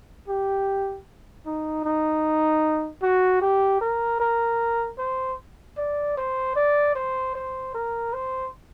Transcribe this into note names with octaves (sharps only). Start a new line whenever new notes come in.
G4
D#4
D#4
F#4
G4
A#4
A#4
C5
D5
C5
D5
C5
C5
A#4
C5